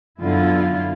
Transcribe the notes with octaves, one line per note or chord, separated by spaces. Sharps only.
F#2 D3 B3 E4 F4